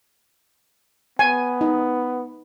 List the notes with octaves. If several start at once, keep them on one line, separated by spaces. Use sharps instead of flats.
B3 G#5
D#4